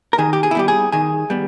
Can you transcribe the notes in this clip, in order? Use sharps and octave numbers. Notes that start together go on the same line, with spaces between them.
A#4
D#3 G#4
G4
G#4
E4
G3 B3 G4
G#4
D#3 G#4
G3 B3